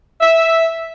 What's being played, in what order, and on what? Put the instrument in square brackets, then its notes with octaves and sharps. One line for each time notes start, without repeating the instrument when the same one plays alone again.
[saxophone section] E5